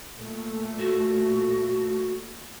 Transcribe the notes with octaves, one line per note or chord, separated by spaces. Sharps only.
A#2 A3
F#4